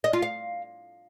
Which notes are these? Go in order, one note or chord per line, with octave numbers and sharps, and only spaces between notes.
D#5
F4
F5